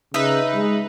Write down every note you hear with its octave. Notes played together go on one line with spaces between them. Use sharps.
C#3 D#4 B4 E5
G#3